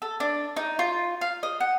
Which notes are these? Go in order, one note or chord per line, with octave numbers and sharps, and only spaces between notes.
A4
D4
D#4
F4
F5
D#5
F#5